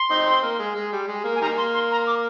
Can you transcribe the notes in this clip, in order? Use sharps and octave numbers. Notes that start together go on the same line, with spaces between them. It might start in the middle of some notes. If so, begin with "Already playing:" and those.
Already playing: C6
C4 D#4
C4
A#3
G#3
G#3
G3
G#3
A#3
G#5
D#3 G3 A#3 A#5
C6
C6
A#5
D6